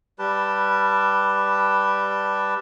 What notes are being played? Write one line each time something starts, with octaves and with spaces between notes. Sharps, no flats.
G3 G4 B4 A5